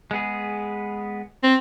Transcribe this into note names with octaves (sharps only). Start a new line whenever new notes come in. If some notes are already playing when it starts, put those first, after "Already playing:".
G#3 B3 G#4
C4